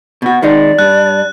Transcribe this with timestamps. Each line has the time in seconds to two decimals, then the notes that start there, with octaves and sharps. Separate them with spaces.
0.22 B2 F#4
0.42 D#3 G#3 D#4 D5
0.79 G2 F#6